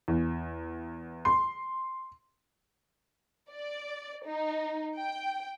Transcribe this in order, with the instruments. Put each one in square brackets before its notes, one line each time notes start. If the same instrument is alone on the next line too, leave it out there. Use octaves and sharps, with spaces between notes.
[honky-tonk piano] E2
C6
[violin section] D5
D#4
G5